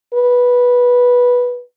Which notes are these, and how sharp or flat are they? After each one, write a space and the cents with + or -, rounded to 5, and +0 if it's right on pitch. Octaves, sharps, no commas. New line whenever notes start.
B4 -10